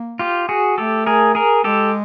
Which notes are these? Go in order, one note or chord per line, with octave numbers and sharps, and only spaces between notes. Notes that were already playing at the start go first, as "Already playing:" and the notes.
Already playing: A#3
F4 G4
F#4 G#4
A3 G4 A4
G#4 A#4
G#4 A#4
G#3 G4 A4